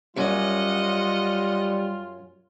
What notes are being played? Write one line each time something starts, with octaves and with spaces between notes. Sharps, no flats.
F#2 G3 C#4 F4 D#5 F#5